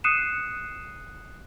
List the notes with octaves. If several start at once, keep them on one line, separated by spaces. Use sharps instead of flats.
D#6 F#6 C7 C#7 D#7 E7